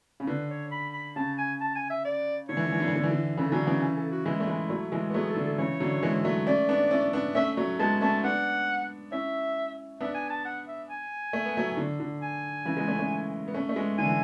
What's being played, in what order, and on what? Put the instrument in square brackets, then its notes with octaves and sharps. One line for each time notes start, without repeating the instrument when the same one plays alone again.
[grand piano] C#3
[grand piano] D3 [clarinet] B4
[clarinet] C#5
B5
B5
[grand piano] C#3 [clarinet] A5
[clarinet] G#5
A5
G#5
E5
D5
[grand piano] D3 [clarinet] C#5
[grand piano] E3
D3
E3
D3
E3
D3
E3
D3
[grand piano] C#3 E3 [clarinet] A4
[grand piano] D3 F#3 [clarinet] C#4
[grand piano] C#3 E3 [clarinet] B3
[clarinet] C#4
A4
F#4
[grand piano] E3 G#3 [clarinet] E4
[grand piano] A3
E3 G#3
F#3 A3
E3 G#3
B3
[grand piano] F#3 A3 [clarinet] G#4
[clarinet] A4
[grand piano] D3
[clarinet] A4
[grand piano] C#3 E3 [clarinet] C#5
[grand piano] D3 F#3
E3 G#3
F#3 A3
[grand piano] A3 C#4 [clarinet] D5
[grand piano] B3 D4
C#4 E4
B3 D4
[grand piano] A3 C#4 [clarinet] E5
[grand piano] F#3 A3
[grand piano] G#3 B3 [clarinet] A5
[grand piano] A3 C#4 [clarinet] A5
[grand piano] B3 D4 [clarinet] F#5
[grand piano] C#4 E4 [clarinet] E5
[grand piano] B3 D4 [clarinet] E5
[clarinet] G#5
A5
F#5
E5
G#5
[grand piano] A3
B3
F#3 A3
D3
D3
[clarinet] G#5
[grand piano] C#3 E3
G#3 B3
A3 C#4
A3 C#4
B3
A3 C#4
A3
G#3 B3
[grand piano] D3 [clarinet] G#5
[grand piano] E3